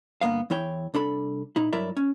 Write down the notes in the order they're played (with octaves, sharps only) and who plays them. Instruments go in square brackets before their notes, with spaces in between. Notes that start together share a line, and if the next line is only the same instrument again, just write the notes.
[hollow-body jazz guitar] D2 G2 A#3 B3 F5
E2 E3 E4 C#5 G5
C2 D4 A4 B5
A#2 D#4 E4
G2 F#3 E4 A#4 D5 E5
C#4